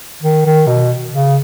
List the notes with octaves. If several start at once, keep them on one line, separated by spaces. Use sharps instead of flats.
D#3
D#3
B2
C#3